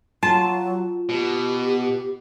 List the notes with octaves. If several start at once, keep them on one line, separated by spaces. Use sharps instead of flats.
F#3 F4 A5
B2 G4